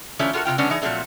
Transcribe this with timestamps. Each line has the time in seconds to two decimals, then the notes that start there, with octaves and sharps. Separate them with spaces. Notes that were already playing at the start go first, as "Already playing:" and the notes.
0.19 D#3 F3 A3 C#4 D4 E4
0.33 F4 F#4 A4 A#4
0.45 C3 G#3 F4 G5
0.58 D3 F#3 G#3 B3 C#4 D4
0.70 E3 D#4 G#4
0.82 A#2 F3 F#3 A3 C4